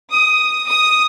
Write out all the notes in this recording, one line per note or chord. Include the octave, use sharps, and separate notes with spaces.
D#6
D#6